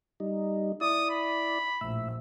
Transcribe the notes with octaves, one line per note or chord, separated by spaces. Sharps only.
G3 D#4
E4 D5 D#6
B5
A#1 A2 E5